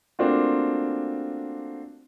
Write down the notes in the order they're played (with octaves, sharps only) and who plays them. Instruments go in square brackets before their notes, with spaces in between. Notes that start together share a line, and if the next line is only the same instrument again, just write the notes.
[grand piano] A3 A#3 C4 D4 F4 F#4